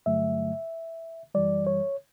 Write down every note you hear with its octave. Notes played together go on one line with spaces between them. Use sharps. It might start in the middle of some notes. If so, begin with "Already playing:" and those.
G2 D3 F#3 A3 E5
F#2 E3 G3 D5
C#5